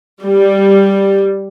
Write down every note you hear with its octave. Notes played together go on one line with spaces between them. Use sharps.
G3